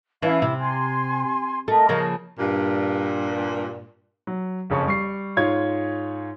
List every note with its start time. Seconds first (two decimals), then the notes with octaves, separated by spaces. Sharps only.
0.22 E3 C#4 E4 F5
0.42 C3 E4
0.60 G#5 C6
1.68 A3 A#4 D#5
1.89 C#3 F3 A#3
2.39 G2 A#2
4.27 F#3
4.70 F#1 F2 C#3 C#4 A5 C#6
4.87 G3 C#6 C7
5.37 G#2 F4 C#5 G#6